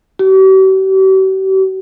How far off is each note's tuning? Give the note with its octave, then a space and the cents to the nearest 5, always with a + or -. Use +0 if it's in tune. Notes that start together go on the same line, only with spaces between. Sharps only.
G4 -45